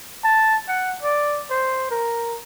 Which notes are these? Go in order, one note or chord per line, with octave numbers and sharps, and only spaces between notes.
A5
F#5
D5
C5
A#4